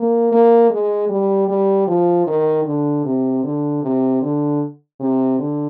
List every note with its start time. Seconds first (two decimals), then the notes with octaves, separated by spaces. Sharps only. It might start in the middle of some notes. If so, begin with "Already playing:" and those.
Already playing: A#3
0.32 A#3
0.70 G#3
1.09 G3
1.48 G3
1.87 F3
2.27 D#3
2.65 D3
3.05 C3
3.44 D3
3.83 C3
4.22 D3
5.00 C3
5.39 D3